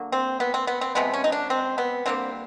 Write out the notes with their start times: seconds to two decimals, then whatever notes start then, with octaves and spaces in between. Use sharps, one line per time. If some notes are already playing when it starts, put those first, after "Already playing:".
Already playing: D3 F#3 A#3
0.12 C4
0.40 B3
0.54 C4
0.67 B3
0.81 C4
0.95 C3 F3 G#3 B3
1.13 C#4
1.24 D#4
1.32 D4
1.50 C4
1.78 B3
2.06 D3 G3 A#3 C4